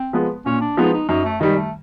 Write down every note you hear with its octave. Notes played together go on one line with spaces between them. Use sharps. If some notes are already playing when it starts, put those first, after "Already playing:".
Already playing: C4
F3 G#3 B3
A#2 C#4
D4
F3 G#3 B3 D#4
D#4
F#2 D#4
A3
D#3 G3 G#3
A3